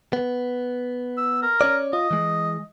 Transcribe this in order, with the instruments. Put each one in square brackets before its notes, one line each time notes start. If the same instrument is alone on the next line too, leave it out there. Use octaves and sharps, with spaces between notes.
[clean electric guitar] B3
[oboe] E6
A#4
[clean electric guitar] C#4 C#5 D5
[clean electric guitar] F4 [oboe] D#5
[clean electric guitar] E3 G#3